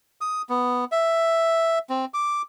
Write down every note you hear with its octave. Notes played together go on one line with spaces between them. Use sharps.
D#6
B3
E5
C4
D6